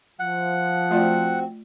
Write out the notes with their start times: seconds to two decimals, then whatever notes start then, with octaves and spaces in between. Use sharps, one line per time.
0.19 F3 F#5
0.91 A3 C4 F4 F#4 D5